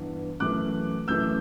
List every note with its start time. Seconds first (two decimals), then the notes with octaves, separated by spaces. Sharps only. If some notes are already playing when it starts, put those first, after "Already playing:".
Already playing: G2 E3 B3
0.40 F#2 E3 A3 D6 F#6
1.08 F#2 E3 A3 E6 G6